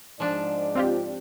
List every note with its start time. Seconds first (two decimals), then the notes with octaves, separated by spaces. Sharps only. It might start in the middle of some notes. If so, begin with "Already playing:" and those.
0.20 G#2 F3 D4 D5
0.75 C4 F4 G4